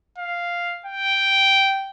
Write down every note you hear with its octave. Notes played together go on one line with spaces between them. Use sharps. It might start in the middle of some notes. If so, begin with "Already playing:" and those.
F5
G5